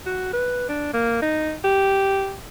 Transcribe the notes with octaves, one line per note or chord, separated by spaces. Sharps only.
F#4
B4
D4
A#3
D#4
G4